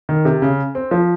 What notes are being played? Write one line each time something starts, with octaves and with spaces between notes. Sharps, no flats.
D#3
C3
C#3
C4
F3